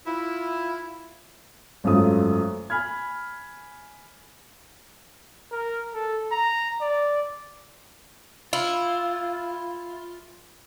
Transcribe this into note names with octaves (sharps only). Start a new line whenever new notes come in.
E4 F4
G#1 F#2 A3 F4 D#6
G#5 B5 F6 G#6
A#4
A4
A#5
D5
E4 F4